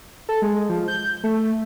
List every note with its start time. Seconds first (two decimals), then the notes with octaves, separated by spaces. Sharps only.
0.29 A4
0.42 G#3
0.69 F3
0.88 G6
1.24 A3